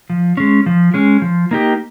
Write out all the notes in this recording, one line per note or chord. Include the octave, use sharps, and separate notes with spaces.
F3
G#3 C#4
F3
G#3 C#4
F3
A#3 D#4 G4